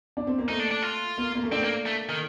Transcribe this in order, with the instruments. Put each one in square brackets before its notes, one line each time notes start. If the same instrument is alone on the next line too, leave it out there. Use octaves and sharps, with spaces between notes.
[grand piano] D4
C4
A#3
[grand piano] A3 [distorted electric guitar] D#4
[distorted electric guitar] D4
D4
F4
[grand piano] A#3
A#3
A3
[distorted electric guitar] C4 [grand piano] D4
[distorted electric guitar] A#3
A3
D#3